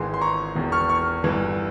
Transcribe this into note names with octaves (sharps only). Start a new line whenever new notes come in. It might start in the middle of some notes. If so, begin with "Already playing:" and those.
Already playing: G#1 G#2 E3 G#5 C6
C6
A#5 C#6
E1 E2 E3
C#6 F6
C#6 F6
G1 G2 E3